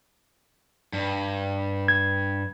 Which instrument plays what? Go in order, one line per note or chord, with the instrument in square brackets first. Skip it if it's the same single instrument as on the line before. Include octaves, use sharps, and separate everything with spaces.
[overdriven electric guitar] G2
[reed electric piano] G#6